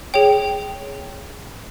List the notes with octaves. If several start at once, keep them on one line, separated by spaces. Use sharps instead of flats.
G#4 C#5 G5